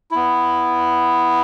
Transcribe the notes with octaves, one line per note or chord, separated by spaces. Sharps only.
B3 E4